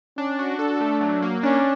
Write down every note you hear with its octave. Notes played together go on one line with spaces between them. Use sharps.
C#4 D4
F#4
D4 A4
A3
F#3
A#3
C#4 D4